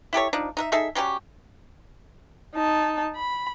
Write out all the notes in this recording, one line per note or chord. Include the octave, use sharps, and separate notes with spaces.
E4 G4 A4 C#5
F3 D4 D#4
D#4 A#4 E5
D#4 G#4 A4 E5
F#3 G3 C#4 G4
D#4 A5
B5